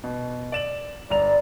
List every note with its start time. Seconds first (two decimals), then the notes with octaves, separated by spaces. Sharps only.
0.04 B2
0.52 D5 E7 F#7
1.10 G1 D5 A#5 F7